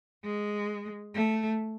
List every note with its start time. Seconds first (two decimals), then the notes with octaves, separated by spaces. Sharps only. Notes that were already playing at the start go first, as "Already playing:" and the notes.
0.24 G#3
1.15 A3